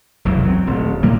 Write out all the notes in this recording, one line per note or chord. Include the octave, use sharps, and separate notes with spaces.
E1 C2 F#2 E3
F#3 C4
D#1 A1
A2 D#3 G3 A#3